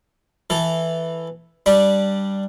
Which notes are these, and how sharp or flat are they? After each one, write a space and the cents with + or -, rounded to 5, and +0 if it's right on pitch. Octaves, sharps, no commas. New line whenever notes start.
E3 +0 A4 +0
G3 +0 D4 +0 B5 -20